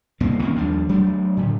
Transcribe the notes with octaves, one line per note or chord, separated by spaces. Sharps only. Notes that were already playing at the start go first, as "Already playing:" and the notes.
C2 G2 A#3 C4
D#3 A#3 C4 C#4
D#2 F3 G3 D4
F#3 A3 D4
A2 D3